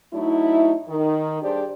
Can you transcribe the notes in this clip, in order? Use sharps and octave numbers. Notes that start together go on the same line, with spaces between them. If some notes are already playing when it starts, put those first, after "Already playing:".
F#3 A3 D#4 E4
D#3
G2 D4 G4 G#4 C5 D5